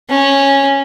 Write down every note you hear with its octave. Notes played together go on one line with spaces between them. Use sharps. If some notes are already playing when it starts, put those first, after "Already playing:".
C#4